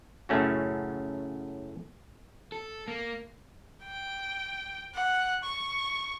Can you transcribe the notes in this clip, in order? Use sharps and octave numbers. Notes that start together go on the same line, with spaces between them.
F#2 A2 C#3 A3 C#4 F#4
A4
A#3
G5
F#5
C#6